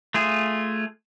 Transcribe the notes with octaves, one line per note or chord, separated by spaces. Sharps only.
A3 F4 G#4